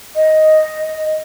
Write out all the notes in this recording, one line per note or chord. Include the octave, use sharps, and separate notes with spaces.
D#5